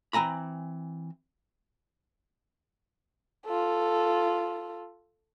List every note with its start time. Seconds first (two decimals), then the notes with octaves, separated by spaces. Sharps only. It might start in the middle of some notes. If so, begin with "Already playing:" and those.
0.13 E3 C4 G#5 A#5 B5
3.47 F4 A4